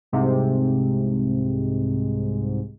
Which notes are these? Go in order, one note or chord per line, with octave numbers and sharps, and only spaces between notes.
C2 G#2 C3